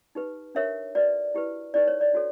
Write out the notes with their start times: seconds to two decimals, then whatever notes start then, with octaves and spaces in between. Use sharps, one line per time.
0.15 D#4 G4 B4
0.55 D4 G4 A#4 C#5 E5
0.95 F#4 B4 D5
1.34 E4 G4 B4
1.74 D#4 G4 B4 D5
1.87 C#5
2.01 D5
2.13 D4 F#4 A4 C#5